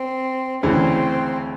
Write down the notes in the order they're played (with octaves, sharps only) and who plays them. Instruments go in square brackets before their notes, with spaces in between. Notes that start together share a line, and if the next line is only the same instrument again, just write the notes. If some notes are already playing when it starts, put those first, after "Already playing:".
Already playing: [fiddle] C4
[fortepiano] D2 C#3 E3 [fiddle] C4